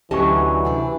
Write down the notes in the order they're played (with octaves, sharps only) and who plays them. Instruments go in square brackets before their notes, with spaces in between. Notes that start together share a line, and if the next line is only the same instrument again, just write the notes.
[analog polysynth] D2 F#3 [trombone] E3 [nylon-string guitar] C#4 D#5 A5 [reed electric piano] G4 C#6
[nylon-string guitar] C3 D4